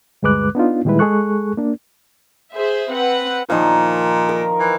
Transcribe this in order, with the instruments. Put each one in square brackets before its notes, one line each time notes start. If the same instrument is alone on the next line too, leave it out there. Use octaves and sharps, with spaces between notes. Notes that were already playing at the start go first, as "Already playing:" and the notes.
[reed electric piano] D2 G2 G#3 B4 D6 F#6
B3 D4 D#4 F4
A#2 D#3 G3 G#3 E4 B4
G#3 G#4 A4 C#6 F#6
A#3 D4
[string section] G#4 C5 E5
C4 B4 F#5
[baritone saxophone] A#2 [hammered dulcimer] D#3 F3
[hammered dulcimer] A#4
[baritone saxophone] E3